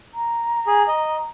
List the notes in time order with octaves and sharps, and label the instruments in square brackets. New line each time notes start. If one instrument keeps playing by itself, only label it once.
[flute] A#5
[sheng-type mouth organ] G#4
D#5